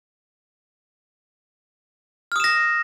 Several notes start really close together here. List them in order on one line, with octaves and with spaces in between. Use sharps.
F6 D#6 E7 A#6